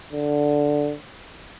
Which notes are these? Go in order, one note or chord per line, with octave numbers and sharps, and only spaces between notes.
D3